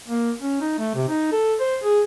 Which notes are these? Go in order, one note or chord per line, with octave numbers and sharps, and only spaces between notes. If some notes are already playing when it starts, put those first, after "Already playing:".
A#3
C#4
D#4
A3
C3
D#4
A4
C5
G#4